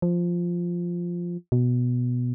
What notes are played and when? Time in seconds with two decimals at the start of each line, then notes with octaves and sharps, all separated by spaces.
0.02 F3
1.52 B2